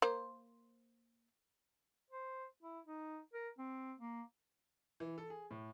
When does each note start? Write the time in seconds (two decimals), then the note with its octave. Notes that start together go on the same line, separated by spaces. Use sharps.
0.02 A#3 C5
2.10 C5
2.63 E4
2.87 D#4
3.34 A#4
3.58 C4
3.99 A#3
5.00 E3
5.18 A4
5.30 G#4
5.51 A2